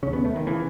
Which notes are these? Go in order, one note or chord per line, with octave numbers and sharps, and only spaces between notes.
D#2 C#3 C#4
B3
A3
D#3
C#3 E3